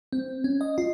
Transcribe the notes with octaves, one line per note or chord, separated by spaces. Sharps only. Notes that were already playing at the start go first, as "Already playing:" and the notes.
C4
C#4
D#5
F4